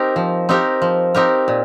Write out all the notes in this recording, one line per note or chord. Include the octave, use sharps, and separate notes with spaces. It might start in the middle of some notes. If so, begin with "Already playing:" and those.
Already playing: C4 D#4 G4 A#4
F3
C4 D#4 G4 A#4
F3
C4 D#4 G4 A#4
A#2